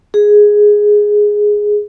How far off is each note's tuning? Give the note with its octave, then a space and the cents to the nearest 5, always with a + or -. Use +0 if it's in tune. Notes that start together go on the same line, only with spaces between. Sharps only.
G#4 +0